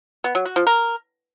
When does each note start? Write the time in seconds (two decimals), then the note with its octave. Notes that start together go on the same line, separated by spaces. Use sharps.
0.24 B3
0.35 F#3
0.45 F#4
0.56 F3
0.67 A#4